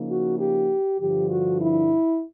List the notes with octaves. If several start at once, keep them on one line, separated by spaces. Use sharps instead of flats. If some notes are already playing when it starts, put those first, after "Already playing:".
Already playing: C#3 F3 A#3 D#4
F#4
G4
G2 D3 F3 G4
F#4
E4